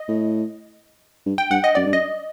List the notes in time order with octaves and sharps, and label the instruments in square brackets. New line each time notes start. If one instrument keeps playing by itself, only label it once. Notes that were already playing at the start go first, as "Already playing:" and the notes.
Already playing: [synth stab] D#5
[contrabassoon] A2
G2
[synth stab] G5
[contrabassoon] G2 [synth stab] F#5
[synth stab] D#5
[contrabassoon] F#2 [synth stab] D5
[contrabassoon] G2
[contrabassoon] F#2 [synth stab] D#5